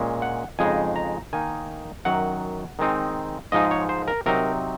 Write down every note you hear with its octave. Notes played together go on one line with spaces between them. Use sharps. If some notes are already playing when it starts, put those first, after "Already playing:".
Already playing: A#2 G#3 C#4
F#5
F2 C#3 G#3 D#4 G#5
A#5
D#3 A#3 D#4 G#5
F#2 D#3 F#3 F#5
D#3 G#3 C4 D#4
G#2 F3 G#3 D#4 D#5
C#5
C5
A#4
C3 F#3 C4 D#4 A#4